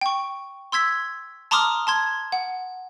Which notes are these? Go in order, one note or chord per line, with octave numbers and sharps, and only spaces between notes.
G5 C#6
C6 E6 G#6 B6
A5 A#5 C6 D6 D#6 F6
A5 C6 G#6
F#5